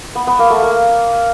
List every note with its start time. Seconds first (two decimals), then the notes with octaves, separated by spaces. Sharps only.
0.15 B3
0.27 B3
0.39 A#3
0.50 A3
0.62 A#3